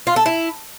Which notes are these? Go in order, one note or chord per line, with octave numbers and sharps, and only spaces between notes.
F4
A4
E4